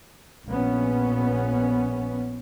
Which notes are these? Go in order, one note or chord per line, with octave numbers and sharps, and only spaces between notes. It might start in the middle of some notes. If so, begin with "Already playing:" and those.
A#1 B3 C#4